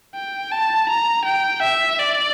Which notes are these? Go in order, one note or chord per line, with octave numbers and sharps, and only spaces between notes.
G5
A5
A#5
G5
E5
D5